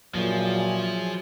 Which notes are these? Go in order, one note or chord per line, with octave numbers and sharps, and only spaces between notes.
G2 A#2 F3 F#3 E4 G#4 C#5